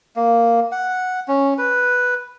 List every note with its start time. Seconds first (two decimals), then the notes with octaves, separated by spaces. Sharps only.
0.16 A#3
0.72 F#5
1.28 C#4
1.58 B4